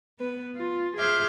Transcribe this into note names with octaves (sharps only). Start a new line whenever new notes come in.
B3 B4
F4
G#4 C5 E5 D6 F6 G6